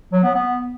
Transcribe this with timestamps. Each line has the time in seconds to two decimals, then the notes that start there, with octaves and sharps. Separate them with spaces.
0.12 F#3
0.23 B3
0.35 B3